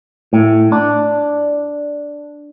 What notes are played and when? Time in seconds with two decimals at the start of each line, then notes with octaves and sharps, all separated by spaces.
0.33 A2
0.72 D4